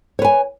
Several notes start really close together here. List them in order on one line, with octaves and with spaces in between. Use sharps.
C#5 B4 G#5